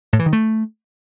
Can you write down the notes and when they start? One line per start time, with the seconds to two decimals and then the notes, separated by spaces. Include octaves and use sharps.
0.13 A2
0.19 E3
0.26 D#3
0.33 A3